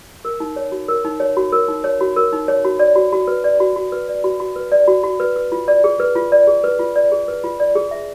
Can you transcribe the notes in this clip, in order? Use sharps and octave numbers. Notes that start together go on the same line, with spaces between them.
A#4
D#4
C#5
F#4
A#4
D#4
C#5
F#4
A#4
D#4
C#5
F#4
A#4
D#4
C#5
F#4
D5
F#4
F#4
B4
D5
F#4
F#4
B4
D5
F#4
F#4
B4
D5
F#4
F#4
B4
B4
F4
D5
G#4
B4
F4
D5
G#4
B4
F4
D5
G#4
B4
F4
D5
G#4
E5